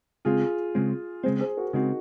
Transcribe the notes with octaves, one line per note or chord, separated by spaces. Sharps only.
C#3 G#3 C4 F4 G#4
C#3 G#3 C4
C#3 G#3 C4 G#4 C5
G#4 C5
F#4 A#4
G#4
C#3 G#3 C4 D#4 F#4